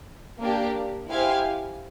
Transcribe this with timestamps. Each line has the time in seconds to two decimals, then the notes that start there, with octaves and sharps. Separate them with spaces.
0.40 A#3 D4 G4
1.08 E4 G4 C5 F5 G#5